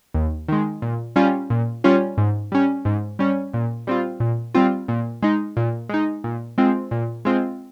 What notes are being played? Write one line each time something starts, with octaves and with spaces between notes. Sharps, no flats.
D#2
D#3 G#3
A#2
G3 C#4 F4
A#2
G3 C#4 F4
G#2
G3 C#4
G#2
G3 C#4
A#2
G3 C4 F4
A#2
G3 C4 F4
A#2
G#3 D#4
A#2
G#3 D#4
A#2
G#3 C4 F4
A#2
G#3 C4 F4